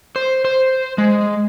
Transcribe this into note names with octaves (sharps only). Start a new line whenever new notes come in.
C5
C5
G#3